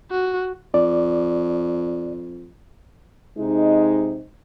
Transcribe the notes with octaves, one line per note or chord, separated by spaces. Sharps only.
F#4
F2 D5
C3 G#3 D#4